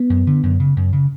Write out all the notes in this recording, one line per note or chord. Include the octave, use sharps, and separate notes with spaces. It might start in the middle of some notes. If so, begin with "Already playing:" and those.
Already playing: B3
F#2
D3
F#2
C#3
F#2
C#3